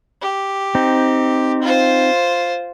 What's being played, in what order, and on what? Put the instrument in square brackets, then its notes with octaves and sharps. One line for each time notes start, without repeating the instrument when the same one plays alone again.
[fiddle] G4
[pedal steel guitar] C4 D#4
[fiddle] F4 C5